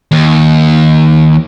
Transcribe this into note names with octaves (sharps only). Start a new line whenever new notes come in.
D#2